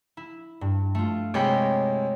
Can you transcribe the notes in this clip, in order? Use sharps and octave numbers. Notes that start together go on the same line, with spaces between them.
E4
G2
A3 F4
C3 G#3 C#5 G5 B5